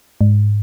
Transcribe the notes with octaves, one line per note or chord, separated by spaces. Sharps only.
G#2